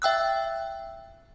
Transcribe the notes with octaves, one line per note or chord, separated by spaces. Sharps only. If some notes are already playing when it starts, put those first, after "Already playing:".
E5 G5 E6 F#6